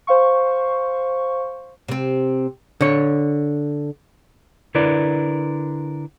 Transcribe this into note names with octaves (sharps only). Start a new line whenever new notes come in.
C5 F5 C#6
C3 C4
D3 C#5
D3 E4 A#4 B4 D5